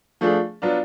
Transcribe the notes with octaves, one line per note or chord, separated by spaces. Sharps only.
F3 A3 D4 F4 G#4
F#3 B3 D4 F4